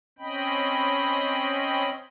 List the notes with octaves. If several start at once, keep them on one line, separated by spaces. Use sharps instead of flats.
C4 C#4 D#5 G5 B5